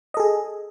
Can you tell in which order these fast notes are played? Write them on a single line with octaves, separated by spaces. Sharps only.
D#5 A4 G#4